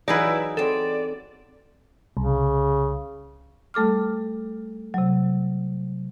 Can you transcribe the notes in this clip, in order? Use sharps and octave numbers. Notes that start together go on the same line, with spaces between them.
E3 F#3 D#4 E4 G#4 B4 D5
F#3 C4 A4 D5
C2 C#3
G3 A3 A4 D6 F6
C3 F#3